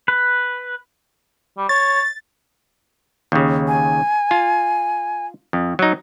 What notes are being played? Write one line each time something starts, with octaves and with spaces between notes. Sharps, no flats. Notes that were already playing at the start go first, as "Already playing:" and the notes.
B4
G3
C#5 A6
D#2 C#3
G#5
F4
F2
F#3 D#4